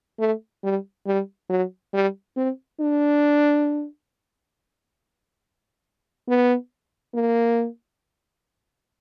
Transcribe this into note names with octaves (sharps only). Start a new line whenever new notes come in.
A3
G3
G3
F#3
G3
C4
D4
B3
A#3